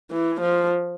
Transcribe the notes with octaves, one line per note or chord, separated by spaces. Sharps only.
E3
F3